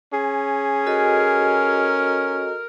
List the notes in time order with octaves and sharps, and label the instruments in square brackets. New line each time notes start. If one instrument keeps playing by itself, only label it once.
[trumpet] C#4 [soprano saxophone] G#4
[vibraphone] F#4 A4 D#5 [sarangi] A#4